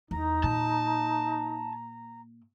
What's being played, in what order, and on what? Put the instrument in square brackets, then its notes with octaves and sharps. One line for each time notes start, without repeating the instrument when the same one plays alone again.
[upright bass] E2 [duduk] D#4 [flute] A#5
[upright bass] A#2 [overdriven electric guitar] A5